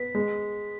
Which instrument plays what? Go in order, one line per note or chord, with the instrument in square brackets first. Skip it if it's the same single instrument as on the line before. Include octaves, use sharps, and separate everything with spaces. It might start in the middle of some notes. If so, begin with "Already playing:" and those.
Already playing: [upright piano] B3 [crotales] B6
[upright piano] G#3